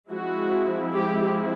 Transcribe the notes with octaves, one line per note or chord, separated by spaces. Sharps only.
F3 G#3 C4 E4 F#4
G4